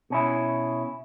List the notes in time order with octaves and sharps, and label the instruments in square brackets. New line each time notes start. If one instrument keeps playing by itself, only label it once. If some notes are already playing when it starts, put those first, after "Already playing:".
[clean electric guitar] B2 C#4 E4